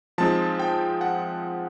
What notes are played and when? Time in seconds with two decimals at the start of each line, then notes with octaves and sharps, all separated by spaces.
0.18 F3 G#3 C4 D#4 A5
0.59 G5
1.01 F#5